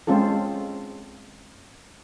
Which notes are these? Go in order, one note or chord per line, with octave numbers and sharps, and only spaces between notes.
G#3 C4 C#4 F4 A4